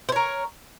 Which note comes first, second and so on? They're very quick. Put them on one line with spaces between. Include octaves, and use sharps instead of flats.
C5 C#5 A#4